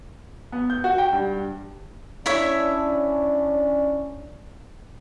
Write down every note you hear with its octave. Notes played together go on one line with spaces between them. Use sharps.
B3
G6
F#4
G5
G2
C#4 D4 E4 C#5 E5